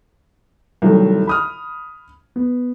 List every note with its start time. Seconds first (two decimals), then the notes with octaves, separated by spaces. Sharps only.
0.82 C2 D#3 F#3 A3
1.27 B5 D#6 F6
2.36 B3